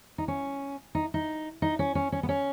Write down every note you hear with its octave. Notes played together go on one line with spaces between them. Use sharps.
D#4
C#4
D#4
D#4
D#4
C#4
C#4
C#4
B3
C#4